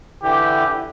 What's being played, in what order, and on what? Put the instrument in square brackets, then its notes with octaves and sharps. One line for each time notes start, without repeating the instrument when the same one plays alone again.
[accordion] D3 E3 [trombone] G4